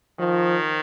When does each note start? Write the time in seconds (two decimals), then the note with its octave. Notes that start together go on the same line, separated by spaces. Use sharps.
0.19 D#3 F3